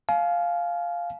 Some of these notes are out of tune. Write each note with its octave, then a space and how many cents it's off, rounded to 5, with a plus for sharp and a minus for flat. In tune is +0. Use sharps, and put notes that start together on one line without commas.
F5 +0 G#5 +40